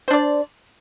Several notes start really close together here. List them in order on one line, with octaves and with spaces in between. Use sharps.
C5 D4 D5